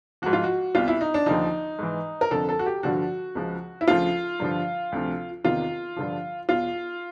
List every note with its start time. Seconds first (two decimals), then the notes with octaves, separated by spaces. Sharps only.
0.22 G#2 F3 F#4
0.33 F4
0.44 F#4
0.75 C2 B2 F4
0.88 E4
1.01 D#4
1.14 D4
1.26 D#2 D3 F3 D#4
1.79 G#2 E3
2.21 A#4
2.31 F2 D3 F3 A4
2.49 A4
2.59 F#4
2.66 G4
2.83 G2 D3 F3 F#4
3.35 C#2 C#3 F3
3.81 E4
3.88 D2 C#3 F3 F4
4.40 G2 D3 F3
4.92 D2 C3 F3
5.44 E2 C3 D#3 F4
5.96 G2 D3 F3
6.49 E2 B2 F4